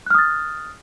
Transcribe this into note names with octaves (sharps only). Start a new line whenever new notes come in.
D#6 F6 F#6 A6